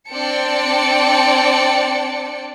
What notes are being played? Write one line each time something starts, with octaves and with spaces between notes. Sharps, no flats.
C4 D4 D5 G5 A5 C#7